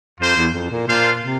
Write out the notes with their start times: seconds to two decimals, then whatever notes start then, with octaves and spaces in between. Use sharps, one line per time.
0.19 F2 A#3 F4 C5
0.36 E2
0.54 F2
0.71 A#2
0.88 A#2 D4 F4 C5 F5
1.22 C3